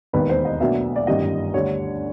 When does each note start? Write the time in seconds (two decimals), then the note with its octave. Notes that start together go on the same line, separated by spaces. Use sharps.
0.13 E1 D#2 D#3 B4
0.29 C5
0.45 D#5
0.60 B1 B2 F#3 A#3 D4 E5
0.96 D5
1.07 G1 F#2 D#3 G3 D#5
1.54 D2 D3 G3 C#5